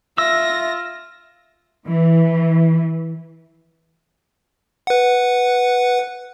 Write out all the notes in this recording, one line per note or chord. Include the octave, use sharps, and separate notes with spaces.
F4 E5 E6 A#6
E3
B4 F#5